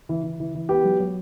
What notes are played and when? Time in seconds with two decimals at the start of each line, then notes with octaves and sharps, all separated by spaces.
0.09 E3
0.24 E3
0.40 E3
0.55 E3
0.69 B3 G4
0.84 F#3
1.00 F#3